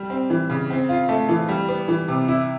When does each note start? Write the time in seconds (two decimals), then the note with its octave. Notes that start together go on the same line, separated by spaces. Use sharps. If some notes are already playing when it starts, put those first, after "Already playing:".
Already playing: G3
0.10 C4
0.30 E3
0.50 C#3
0.70 C4
0.89 F4
1.09 A3
1.29 E3
1.49 G3
1.69 B3
1.88 E3
2.08 C3
2.28 E4